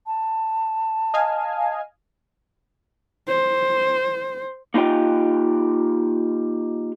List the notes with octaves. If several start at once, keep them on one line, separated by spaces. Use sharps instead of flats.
A5
D#5 F5 G#5
C5
A#3 D#4 F4 G4 G5